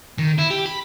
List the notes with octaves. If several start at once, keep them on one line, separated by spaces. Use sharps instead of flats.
D#3
E4
G4
B5